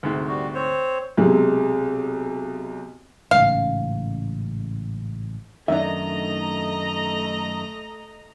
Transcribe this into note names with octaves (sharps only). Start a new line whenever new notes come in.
D2 G#2 C3
G3 F#4
C4 C5 C#5
B1 C3 G#3
A1 G#2 C#3 F5
F#2 D#3 A3 D4 D#4 D#5 E5 A#5